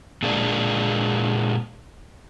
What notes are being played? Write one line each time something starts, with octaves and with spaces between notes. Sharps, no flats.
A#2 G#3 A#3 D4